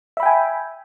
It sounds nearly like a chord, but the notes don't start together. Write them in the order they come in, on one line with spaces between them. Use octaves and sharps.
E5 B5 G5 G#5